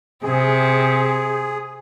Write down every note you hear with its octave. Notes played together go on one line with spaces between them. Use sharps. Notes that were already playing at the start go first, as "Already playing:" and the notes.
C3 C4 G#4